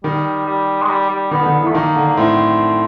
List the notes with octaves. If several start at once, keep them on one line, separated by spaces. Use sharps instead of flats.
D#3 G3
G3
G#3
G3
G3
D#3 B3
D3
D#3
E3
A3
D#3 A#3
D3
A2 C4